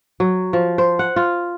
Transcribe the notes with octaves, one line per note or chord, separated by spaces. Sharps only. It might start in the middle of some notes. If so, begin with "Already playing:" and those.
F#3
F3
C5
F#5
F4